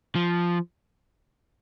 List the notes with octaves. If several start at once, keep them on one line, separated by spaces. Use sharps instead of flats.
F3